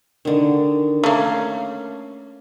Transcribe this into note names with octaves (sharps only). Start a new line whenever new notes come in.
D3 D#3
A3 A#3 C#4